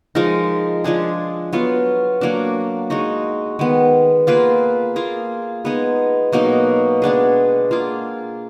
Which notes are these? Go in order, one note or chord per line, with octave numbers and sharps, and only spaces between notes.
F3 G#3 D#4 A#4
F3 G#3 D4 G#4
F#3 B3 F4
F#3 A#3 D4
G#3 D#4 F#4
D#3 G#3 B3
A#3 F4 G#4 B4
A#3 F4 G#4
G#3 B3 D#4 G#4
B2 F#3 A#3 D#4
G#3 B3 D4 G#4
A#3 F4 G#4